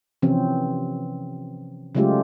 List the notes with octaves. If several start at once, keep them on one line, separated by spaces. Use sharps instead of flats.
C3 E3 F3 C4 C#4
C#3 F#3 G#3 A3 F4 G4